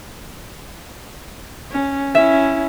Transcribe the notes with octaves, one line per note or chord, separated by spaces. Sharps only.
C#4
C#4 E4 E5